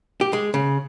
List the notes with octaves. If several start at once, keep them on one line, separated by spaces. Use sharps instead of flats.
G4
G#3
C#3